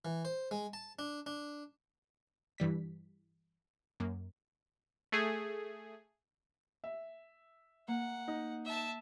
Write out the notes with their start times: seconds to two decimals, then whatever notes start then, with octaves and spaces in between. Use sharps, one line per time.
0.05 E3
0.25 C5
0.51 G#3
0.73 A5
0.99 D4
1.26 D4
2.58 G2 E3 G3 B6
4.00 F#2 A#3
5.12 A3 G#4
6.84 E5
7.88 A#3 F#5
8.28 D#4
8.65 E5 A5